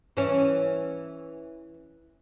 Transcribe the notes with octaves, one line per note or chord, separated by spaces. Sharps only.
E3 C#4